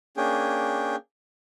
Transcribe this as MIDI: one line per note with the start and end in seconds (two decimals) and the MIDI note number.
0.17 0.96 58
0.17 0.96 61
0.17 0.96 62
0.17 0.96 68
0.17 0.96 79